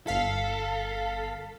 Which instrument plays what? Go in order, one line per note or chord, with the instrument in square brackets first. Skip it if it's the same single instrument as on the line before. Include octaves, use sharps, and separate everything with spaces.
[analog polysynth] G1 F5 B6 [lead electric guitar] A4